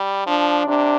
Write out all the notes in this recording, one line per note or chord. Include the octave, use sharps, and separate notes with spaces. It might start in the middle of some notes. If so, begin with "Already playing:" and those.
Already playing: G3
F3 D4
C3 D4